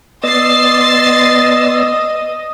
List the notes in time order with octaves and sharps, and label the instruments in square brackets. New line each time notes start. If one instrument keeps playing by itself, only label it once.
[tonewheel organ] B3 D5 E6 [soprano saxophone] D#5 [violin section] C6 A6 C7